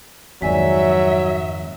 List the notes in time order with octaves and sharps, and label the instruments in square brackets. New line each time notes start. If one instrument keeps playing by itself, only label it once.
[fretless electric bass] F2 G#2 D#3 [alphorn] F#3 [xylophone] D5 G#5 B6 [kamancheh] E5